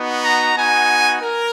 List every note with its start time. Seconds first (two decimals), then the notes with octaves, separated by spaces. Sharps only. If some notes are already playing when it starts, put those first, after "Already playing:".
Already playing: B3 D#4 F#4
0.23 A#5
0.56 B3 D#4 F#4 G#5
1.22 A#4